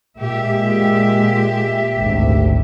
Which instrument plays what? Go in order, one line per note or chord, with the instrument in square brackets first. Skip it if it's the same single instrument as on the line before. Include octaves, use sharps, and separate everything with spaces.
[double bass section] A#2 G#3 [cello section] G4 E5
[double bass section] G#1 D2